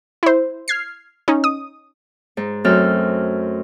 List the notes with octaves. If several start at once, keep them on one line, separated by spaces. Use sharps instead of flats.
E4 C5
F6 G#6 C7
C#4 D#4
D#6
G#2
F#2 A3 C4 A4 F6